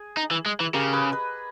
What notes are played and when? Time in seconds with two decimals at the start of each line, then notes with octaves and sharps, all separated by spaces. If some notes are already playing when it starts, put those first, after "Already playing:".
Already playing: G#4
0.17 D#4
0.31 E3
0.46 G#3
0.60 E3
0.74 C#3 G4 A#4
0.93 G#4 B4
1.12 B4 D#5